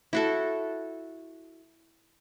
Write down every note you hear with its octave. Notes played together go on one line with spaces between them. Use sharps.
E4 F#4 A4